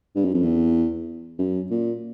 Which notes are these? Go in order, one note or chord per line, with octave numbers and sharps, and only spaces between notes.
G2
F#2
F2
E2
F#2
A#2